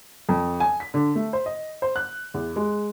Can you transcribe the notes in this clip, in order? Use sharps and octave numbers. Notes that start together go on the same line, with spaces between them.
F2
G#5
B6
D3
A3
C5
D#5
C5
F#6
E2
G#3